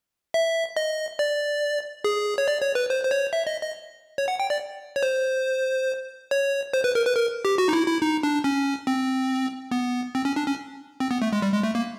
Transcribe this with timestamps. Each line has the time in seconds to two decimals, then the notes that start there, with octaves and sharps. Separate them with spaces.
0.34 E5
0.77 D#5
1.19 D5
2.04 G#4
2.38 C#5
2.48 D5
2.62 C#5
2.75 B4
2.90 C5
3.04 C5
3.11 C#5
3.33 E5
3.47 D#5
3.62 D#5
4.18 C#5
4.28 F#5
4.40 G5
4.50 D5
4.96 C#5
5.03 C5
6.31 C#5
6.73 C5
6.84 B4
6.95 A#4
7.06 B4
7.16 A#4
7.45 G4
7.58 F#4
7.68 D#4
7.73 E4
7.87 E4
8.02 D#4
8.23 D4
8.44 C#4
8.87 C4
9.71 B3
10.15 C4
10.25 C#4
10.36 D4
10.47 C#4
11.00 C4
11.11 B3
11.22 A3
11.33 G#3
11.42 G3
11.53 G#3
11.63 A3
11.75 A#3